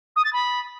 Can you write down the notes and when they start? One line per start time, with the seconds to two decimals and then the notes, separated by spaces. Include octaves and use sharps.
0.16 D#6
0.24 A6
0.33 B5